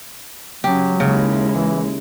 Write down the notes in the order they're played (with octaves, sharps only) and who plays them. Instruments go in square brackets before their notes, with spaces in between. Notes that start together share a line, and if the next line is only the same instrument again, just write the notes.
[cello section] C#3 [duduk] F#3 [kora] G4
[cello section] D#2 G#3 E4 [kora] C#3
[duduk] E3